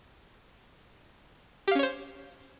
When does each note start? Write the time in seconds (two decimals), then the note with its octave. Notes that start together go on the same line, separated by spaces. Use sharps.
1.68 G4
1.71 F5
1.75 C#4
1.79 C#5
1.83 C5